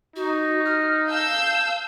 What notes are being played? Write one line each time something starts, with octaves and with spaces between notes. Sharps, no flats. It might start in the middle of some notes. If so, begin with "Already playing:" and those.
D#4 F#4
F6
F5 A5 E6 G6